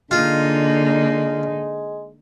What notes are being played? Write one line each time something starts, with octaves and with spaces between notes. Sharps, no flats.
D3 G#3 A#3 D#4 F4